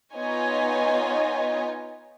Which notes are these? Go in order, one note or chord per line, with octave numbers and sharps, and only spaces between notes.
B3 D#4 F4 C#5 D#5 G#5